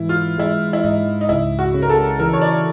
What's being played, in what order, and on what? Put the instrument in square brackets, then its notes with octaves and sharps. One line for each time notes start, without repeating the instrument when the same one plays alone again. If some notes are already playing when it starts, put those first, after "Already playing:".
Already playing: [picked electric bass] G#2 E3 [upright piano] E4
[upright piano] F4
[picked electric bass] G#3 [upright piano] E4
[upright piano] E4
[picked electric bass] G#2 [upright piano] D#4
[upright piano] D#4
[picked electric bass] C#2 [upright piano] E4
[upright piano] F#4
[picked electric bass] C#3
[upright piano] A#4
A4
[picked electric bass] E3 [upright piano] A#4
[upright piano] C#5
D5